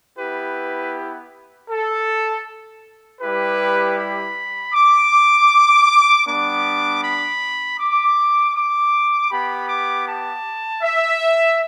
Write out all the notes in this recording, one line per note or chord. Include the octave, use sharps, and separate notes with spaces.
B3 E4 G4 B4
A4
G3 E4 G4 B4
B5
D6
G3 B3 D4 D6
B5
D6
D6
B3 G4 B5
D6
A5
E5